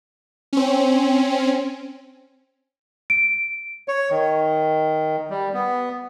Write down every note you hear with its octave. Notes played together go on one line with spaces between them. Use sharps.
C4 C#4
D7
C#5
D#3
G3
B3